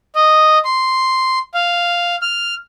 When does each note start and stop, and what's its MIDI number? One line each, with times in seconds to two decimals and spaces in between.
0.15 0.59 75
0.65 1.39 84
1.54 2.16 77
2.22 2.54 89